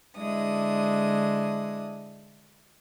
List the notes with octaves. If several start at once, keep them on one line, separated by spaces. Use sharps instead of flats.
D3 G#3 D4 E4 D#6